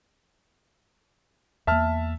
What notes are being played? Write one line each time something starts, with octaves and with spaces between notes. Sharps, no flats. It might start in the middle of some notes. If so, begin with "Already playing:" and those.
E2 A#3 E5 A5 F6